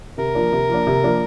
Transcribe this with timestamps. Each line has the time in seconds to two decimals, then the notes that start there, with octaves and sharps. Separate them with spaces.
0.18 C3 A#4
0.35 F3 A#3 D4
0.52 C3
0.69 F3 A#3 D4
0.87 C3
1.04 F3 A#3 D4